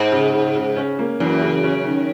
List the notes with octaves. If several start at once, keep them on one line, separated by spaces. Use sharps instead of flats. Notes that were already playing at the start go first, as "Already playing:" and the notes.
Already playing: G#2
C#3
C#3
C#3
C#4
A#3
F#2 E3
C#3
C#4
D#3